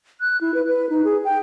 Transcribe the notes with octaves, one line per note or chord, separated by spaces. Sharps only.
F#6
E4
B4
B4
D#4
G#4
G5